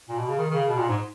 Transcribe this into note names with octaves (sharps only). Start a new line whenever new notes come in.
A#2
B2
C#3
D#3
D#3
C#3
B2
A#2
G#2